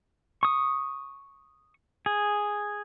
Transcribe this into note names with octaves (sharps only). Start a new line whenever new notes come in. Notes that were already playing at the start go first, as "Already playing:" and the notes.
C#6 D#6
G#4